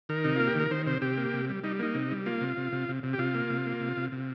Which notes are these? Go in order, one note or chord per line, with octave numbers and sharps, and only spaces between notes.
D#3 A#4
C3 D#4
A#3 F4
G4
D#3 A#4
D#3 C5
C3 C5
C3 G4
A#3
C3
G3
G3 D#4
A#3 D#4
C3
G3
A#3 F4
C3
C3
C3
C3
C3
G4
C3 F4
A#3
C3
A#3
C3
C3
C3